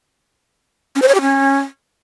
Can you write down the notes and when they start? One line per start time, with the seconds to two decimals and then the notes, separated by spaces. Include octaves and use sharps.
0.95 C#4
1.02 C5
1.08 C#5
1.15 G4
1.21 C#4